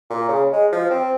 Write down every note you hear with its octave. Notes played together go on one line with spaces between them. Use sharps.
A#2
C#3
G#3
F3
C4